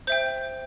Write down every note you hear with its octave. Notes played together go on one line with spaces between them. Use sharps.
C5 E5 G5 G6